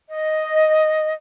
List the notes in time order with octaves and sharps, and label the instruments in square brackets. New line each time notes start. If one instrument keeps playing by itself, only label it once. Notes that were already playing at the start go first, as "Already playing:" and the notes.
[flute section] D#5